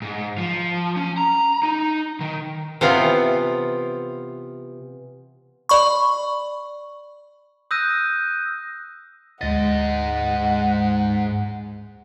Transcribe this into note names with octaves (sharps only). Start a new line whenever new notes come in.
G#2
F3
C#4
A#5
D#4
D#3
C3 E3 B3 F4
D5 B5 C#6
D#6 E6 F#6 G6 A#6 D#7
D2 G#2 G#3 D#5 F#5 A6